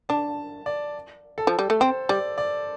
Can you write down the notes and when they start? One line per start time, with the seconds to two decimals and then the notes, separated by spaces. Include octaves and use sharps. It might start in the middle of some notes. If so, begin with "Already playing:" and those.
0.09 D4 A5
0.66 D5
1.38 A4
1.47 F3
1.59 G3
1.70 A3
1.80 C4 C5
2.09 G3 D5
2.38 D5